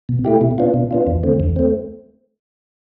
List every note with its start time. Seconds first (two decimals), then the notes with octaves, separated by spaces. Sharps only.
0.09 B2
0.25 A3 E4 G4
0.41 B2
0.58 B3 D4 F4
0.74 B2
0.91 B3 D4 F4
1.07 E2
1.23 D3 A3 C4
1.40 E2
1.56 A3 C4